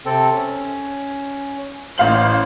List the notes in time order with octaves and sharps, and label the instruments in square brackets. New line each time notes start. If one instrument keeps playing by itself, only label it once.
[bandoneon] C3 C4 A4
C#4
[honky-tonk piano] A1 F5 F#7 [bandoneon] C5